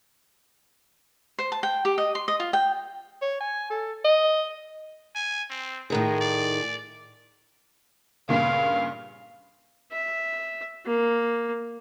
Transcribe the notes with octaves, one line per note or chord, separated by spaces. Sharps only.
C5
A5
G5
G4
D#5
C6
D#5
F4
G5
C#5
G#5
A4
D#5
G#5
C4
A2 D#3 G#3 G#4
D5
G2 A#2 C#3 F5
E5
A#3